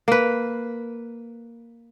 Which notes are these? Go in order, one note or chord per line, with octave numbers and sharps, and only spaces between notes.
A#3 B4